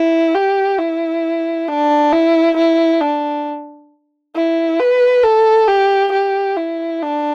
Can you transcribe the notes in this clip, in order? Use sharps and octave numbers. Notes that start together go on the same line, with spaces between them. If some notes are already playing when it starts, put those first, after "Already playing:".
Already playing: E4
G4
E4
D4
E4
E4
D4
E4
B4
A4
G4
G4
E4
D4